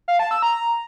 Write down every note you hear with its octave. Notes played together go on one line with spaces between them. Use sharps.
F5
A5
E6
A#5